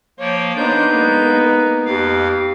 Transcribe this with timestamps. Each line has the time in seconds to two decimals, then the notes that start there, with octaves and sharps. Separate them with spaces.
0.19 F3 A#3 C#5 G5
0.57 B3 D4 D#4 C5 G6
0.92 G#3 A#3
1.86 F2 G4 F5